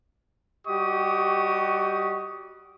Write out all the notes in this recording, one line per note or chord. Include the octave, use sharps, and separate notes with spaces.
G3 F#4 G4 D#5 C#6 D#6